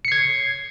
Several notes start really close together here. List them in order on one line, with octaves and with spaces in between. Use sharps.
C#7 C7 G#6